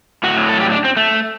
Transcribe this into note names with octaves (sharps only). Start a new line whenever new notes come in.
A2 F#3 F#4
A4
G4
D4
C4
A3